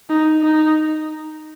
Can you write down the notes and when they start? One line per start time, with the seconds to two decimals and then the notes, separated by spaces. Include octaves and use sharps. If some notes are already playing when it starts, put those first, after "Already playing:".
0.09 D#4
0.41 D#4